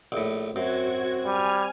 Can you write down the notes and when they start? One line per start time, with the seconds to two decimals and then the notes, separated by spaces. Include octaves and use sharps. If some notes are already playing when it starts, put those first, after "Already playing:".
0.12 A#1 A2
0.56 F#2 C4 F#4 G#6
1.25 G3 G#5 F6